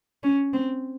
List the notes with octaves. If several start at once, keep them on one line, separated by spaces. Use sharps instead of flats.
C#4
C4